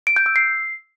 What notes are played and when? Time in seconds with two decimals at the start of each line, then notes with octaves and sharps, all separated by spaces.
0.07 D7
0.16 G6
0.26 E6
0.36 C7